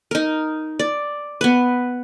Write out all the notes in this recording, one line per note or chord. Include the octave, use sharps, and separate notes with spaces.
D#4 A#4
D5
B3 B4